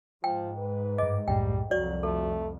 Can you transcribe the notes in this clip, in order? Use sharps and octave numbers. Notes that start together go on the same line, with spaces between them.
G#2 F3 G5
B4
G2 D#5 D6
C2 F#2 A2 G3 G5
C2 F2 F#3 F#4 D5
A3 A4